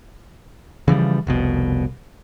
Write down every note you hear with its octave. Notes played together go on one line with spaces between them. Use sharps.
C#3 E3 F3 G3
F1 C2 B2